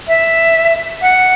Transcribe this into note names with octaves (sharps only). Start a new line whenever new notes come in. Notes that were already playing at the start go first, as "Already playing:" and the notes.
E5
F#5